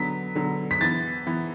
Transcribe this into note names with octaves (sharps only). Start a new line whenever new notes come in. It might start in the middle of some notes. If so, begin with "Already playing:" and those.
Already playing: D3 F#3 B3 B6
D3 F#3 B3
B6
E3 B3 A6
E3 B3